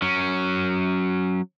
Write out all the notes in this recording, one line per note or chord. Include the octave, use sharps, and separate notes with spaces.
F#3 C#4